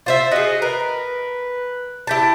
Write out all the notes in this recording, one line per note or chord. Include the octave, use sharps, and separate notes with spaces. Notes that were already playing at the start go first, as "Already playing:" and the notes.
F4 C5 E5
F#4 G#4 D#5
A#4 B4
E4 G4 A5